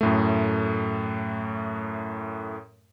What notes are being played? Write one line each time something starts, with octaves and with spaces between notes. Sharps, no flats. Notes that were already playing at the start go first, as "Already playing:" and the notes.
F#2 A2 A3